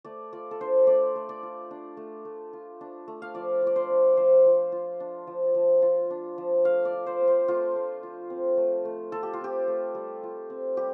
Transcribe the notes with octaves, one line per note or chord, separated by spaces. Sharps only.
A3 D5
F4 D5
A4
D4 C5
A3 D5
A3
D5
F4
D4
A3
A3
F4
D4
A3
F5
F3 D5
F4 D5
C5
D4
F3 C5
F3
F4
D4
F3
F3
F4
D4
F3
A3 F5
D5
F4
C5
C4
C5
A3 F4
A3
F4
C4
A3
A3
F4 A4
G4
F4
C4 G4
A3
G3
F4
C4
G3 G4